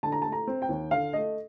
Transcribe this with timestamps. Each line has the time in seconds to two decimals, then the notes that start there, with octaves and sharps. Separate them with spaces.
0.03 D3 A5
0.12 A#5
0.22 A3 A5
0.32 A#5
0.47 C4
0.62 G5
0.69 D#2
0.91 D3 F5
1.13 A3 D#5